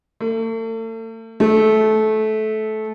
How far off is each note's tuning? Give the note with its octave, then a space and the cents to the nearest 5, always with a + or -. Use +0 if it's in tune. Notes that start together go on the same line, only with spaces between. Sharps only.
A3 +40
A3 -20